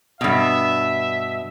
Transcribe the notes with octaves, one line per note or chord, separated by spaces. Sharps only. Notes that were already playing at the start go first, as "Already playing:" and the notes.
G2 B2 E5